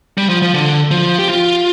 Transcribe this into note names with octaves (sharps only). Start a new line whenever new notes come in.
G3
F3
F3
D3
F3
G4
F4